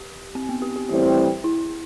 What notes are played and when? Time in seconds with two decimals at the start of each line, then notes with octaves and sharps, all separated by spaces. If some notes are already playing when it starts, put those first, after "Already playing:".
Already playing: G4
0.35 C4
0.49 B3
0.62 G4
0.76 G4
0.89 A2 E3 G3 C4 G4
1.44 E4